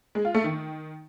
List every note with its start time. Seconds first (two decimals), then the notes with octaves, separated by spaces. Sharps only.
0.15 G#3
0.25 F4
0.34 A3
0.44 D#3